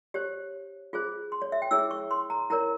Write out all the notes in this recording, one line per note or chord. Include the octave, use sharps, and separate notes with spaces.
G4 C5 C#5
F4 G#4 C5
C6
C#5
E5
G5
E4 G#4 C#5 E6
C#6
C6
A#5
E4 A#4 C#5 A#5